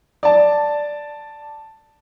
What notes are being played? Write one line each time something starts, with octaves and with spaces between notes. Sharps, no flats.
D5 A5